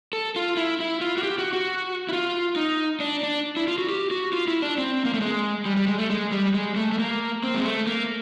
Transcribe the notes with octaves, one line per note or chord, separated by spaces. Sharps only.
A4
F4
E4
E4
F4
F#4
G4
F#4
F#4
E4
F4
D#4
D4
D4
E4
F4
F#4
G4
F#4
F4
E4
D4
C4
A#3
A3
G#3
G3
G3
G#3
A3
G#3
G3
G#3
A3
A3
A#3
C4
G#3
A3
A#3